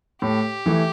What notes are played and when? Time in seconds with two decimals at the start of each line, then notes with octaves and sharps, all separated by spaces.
0.22 A2 G4
0.66 E3 A3 E4